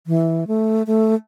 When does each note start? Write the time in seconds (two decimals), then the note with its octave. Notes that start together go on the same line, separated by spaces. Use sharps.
0.07 E3
0.47 A3
0.87 A3